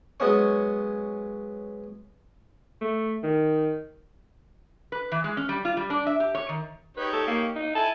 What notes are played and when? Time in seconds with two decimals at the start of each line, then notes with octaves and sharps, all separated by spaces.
0.20 F#3 G#3 B3 C#4 C#5
2.81 A3
3.23 D#3
4.92 B4
5.12 E3
5.24 G#3
5.37 C#4
5.49 G3
5.65 F4
5.77 G3
5.90 D4
6.07 E5
6.20 G4
6.35 C#5
6.49 D#3
6.97 D#4 G4 B4 C#5
7.13 A4
7.27 A#3
7.56 D#4
7.75 E4 G#5 A5